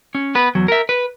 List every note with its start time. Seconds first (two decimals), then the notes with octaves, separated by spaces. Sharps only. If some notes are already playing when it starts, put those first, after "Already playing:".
0.15 C#4
0.35 B3 B4
0.55 E2 F#3
0.68 A#4 E5
0.89 B4